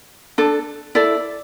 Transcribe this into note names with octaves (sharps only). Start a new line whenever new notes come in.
D4 A4
E4 A4 D5